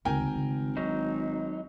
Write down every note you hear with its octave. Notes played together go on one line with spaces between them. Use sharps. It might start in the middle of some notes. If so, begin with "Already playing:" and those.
G#1 D2 C#3 A#4 G5 G#5
C#3 A3
F#3 D4 D#4